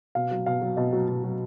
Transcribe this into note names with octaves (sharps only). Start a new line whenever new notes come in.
B2 F5
F#3
B2 F5
F#3
B2 D#5
F#3
B2
F#3